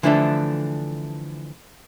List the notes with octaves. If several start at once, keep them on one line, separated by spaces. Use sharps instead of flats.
D3 E3 F3 A3 C4 D4